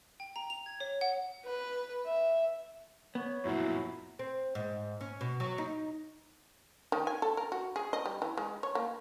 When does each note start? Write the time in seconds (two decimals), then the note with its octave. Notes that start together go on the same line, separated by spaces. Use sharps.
0.20 G5
0.36 A#5
0.50 F7
0.66 G#6
0.80 C#5
1.01 F#5
1.45 B4
2.06 E5
3.15 B3 C#5
3.45 F#2 A#2 F3 F#3 E4
4.19 C4
4.55 G#2
5.01 C#4
5.21 B2
5.40 F#3
5.58 D#4
6.92 D#3
7.07 G#5
7.22 A4
7.37 A#4
7.52 F#4
7.76 G#4
7.93 D#5
8.06 G3
8.22 E3
8.37 G#3
8.63 C#5
8.75 A#3